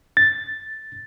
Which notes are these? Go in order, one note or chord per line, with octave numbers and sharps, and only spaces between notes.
A6